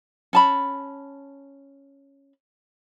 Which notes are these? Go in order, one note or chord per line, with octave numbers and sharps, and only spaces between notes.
C#4 A5 B5